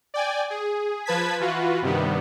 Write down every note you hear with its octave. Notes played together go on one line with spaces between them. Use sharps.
D5 G5 G#5
G#4
F3 B4 A5 G#6 B6
E3 F4 F#4 B4
G2 C3 D#3 G3 B3